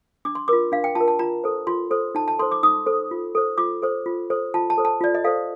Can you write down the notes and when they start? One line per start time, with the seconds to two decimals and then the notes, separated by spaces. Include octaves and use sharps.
0.25 D4 D6
0.35 C6
0.48 F4 A#4 D6
0.72 D4 F5
0.84 G5
0.95 F4 A#4 A5
1.08 A5
1.19 F4 A#5
1.44 A4 C5
1.67 F4 C6
1.91 A4 C5
2.15 D#4 A5
2.28 A5
2.39 A4 C5 C6
2.51 D6
2.63 D#4 D#6
2.86 A4 C5
3.11 F4
3.35 A4 C5
3.58 F4 D6
3.82 A4 C5
4.06 F4
4.30 A4 C5
4.54 F4 A5
4.70 A5
4.78 A4 C5
4.85 A5
5.01 F4 D5
5.15 D#5
5.24 A4 C5 F5